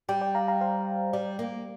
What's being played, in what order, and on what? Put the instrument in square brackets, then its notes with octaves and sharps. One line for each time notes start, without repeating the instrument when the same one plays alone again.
[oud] G3 [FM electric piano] D5 G5
[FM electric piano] D5 G5
F5 A#5
F5 A#5
C5 F5
[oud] G3 [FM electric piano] D5
[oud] A#3